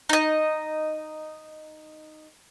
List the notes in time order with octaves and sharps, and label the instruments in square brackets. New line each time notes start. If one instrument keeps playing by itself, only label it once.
[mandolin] D#4 D#5